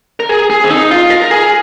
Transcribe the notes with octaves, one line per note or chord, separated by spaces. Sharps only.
A#4
G#4
G#4
C4
D#4
F4
A#4
G#4